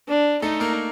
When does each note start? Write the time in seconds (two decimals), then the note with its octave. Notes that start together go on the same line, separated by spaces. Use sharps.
0.08 D4
0.42 A3 D#4 A4
0.60 A#3 A#4